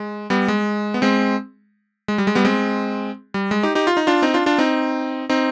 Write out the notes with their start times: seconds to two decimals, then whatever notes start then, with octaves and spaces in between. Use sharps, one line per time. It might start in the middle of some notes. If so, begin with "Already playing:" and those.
Already playing: G#3
0.30 G3 B3
0.48 G#3
0.94 B3
1.02 G#3 C4
2.08 G#3
2.18 G3
2.27 G#3
2.35 G3 B3
2.45 G#3 C4
3.34 G3
3.51 G#3
3.63 D#4 G4
3.75 D#4 G4
3.87 F4
3.97 D#4
4.07 D4 F4
4.22 C4 D#4
4.34 D4 F4
4.46 D4 F4
4.58 C4 D#4
5.29 C4 D#4